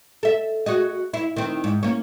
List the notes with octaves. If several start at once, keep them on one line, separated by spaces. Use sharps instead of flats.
A4 E5
F#4 G#4 D#5
E4
D#3 C4
G#2
A#3 C#4